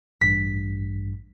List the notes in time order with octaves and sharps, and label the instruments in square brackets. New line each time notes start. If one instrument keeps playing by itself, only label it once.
[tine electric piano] A1 G2 [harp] B6